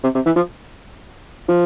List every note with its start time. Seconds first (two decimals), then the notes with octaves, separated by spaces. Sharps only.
0.03 C3
0.14 C3
0.26 E3
0.36 F3
1.48 F3